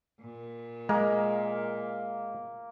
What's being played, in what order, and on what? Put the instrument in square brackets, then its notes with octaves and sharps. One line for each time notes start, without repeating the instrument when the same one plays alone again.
[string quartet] A#2
[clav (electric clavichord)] G#3 [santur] A#3